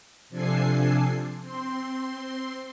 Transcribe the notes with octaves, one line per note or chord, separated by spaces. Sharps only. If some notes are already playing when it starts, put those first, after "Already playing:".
C3 F3 D4 A4 G#5 C7
C4 C6